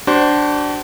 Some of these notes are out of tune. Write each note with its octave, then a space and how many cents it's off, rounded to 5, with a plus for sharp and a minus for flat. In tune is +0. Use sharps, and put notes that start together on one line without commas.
D4 +0 F#4 +45 C5 +0